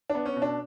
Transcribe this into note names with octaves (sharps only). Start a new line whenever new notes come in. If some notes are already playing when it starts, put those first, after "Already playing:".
D4
B3
C#4
B2
D4